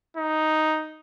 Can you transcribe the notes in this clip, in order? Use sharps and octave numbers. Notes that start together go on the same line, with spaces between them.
D#4